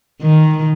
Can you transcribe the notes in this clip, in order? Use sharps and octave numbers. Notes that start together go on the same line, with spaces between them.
D#3